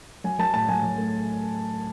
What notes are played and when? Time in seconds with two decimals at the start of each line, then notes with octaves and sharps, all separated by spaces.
0.24 F#3 G#5
0.39 F#3 A5
0.53 A2 A5
0.69 F#3 G#5
0.83 F#3
0.97 A3